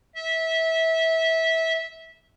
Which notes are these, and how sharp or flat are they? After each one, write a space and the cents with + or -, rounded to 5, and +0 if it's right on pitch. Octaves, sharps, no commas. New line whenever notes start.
E5 -20